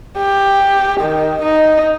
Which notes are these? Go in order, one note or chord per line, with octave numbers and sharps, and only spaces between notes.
G4
D#3
D#4